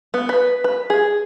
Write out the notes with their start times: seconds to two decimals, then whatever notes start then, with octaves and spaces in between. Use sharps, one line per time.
0.14 B3
0.29 B4
0.64 B4
0.90 G#4